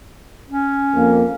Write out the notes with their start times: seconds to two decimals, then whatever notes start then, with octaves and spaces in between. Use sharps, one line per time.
0.50 C#4
0.95 F2 A#3